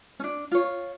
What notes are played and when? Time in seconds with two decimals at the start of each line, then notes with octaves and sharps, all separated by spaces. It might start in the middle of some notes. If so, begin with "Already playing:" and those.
0.20 C#4 D4
0.52 F4 C#5